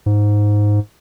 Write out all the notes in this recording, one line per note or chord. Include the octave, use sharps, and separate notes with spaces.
G#2